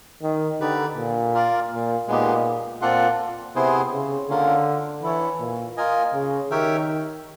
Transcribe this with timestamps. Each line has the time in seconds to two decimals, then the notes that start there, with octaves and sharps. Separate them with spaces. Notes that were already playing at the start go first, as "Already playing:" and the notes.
0.23 D#3
0.60 D3 D#4 G4 B4 D5
0.97 A#2
1.34 F4 A#4 D5 F5
1.71 A#2
2.07 A#2 G#3 B3 D#4 G4
2.81 A#2 C4 F4 A4 D5 F#5
3.56 C3 B3 E4 G#4 C5
3.92 C#3
4.29 D3 A#3 C#4 F4 A#4
5.03 E3 E4 A4 C#5
5.40 A#2
5.77 F4 A#4 D#5 G#5
6.14 C#3
6.51 D#3 G4 A#4 C#5 E5 G5